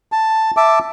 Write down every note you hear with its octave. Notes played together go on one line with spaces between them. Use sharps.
A5
E5 A5 D6